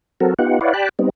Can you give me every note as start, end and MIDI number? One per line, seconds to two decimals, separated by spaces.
0.20 0.34 54
0.20 0.34 60
0.20 0.34 66
0.20 0.34 69
0.20 0.34 70
0.39 0.59 59
0.39 0.59 63
0.39 0.59 65
0.39 0.59 67
0.39 0.59 78
0.61 0.73 64
0.61 0.73 71
0.61 0.73 73
0.61 0.73 74
0.61 0.73 77
0.61 0.73 78
0.73 0.89 67
0.73 0.89 74
0.73 0.89 79
0.73 0.89 81
0.73 0.89 83
0.73 0.89 90
0.99 1.10 55
0.99 1.10 59
0.99 1.10 60
0.99 1.10 63